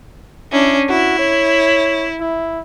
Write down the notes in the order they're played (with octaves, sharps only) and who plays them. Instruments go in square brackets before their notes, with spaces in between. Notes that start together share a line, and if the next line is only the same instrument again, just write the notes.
[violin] C#4 D4 [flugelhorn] E4
[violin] E4 [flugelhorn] F#4
[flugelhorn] C#5
E4